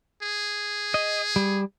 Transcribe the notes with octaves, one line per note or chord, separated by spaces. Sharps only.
G#4
D#5
G3